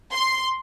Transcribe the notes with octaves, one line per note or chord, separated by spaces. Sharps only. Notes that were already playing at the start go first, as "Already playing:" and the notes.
C6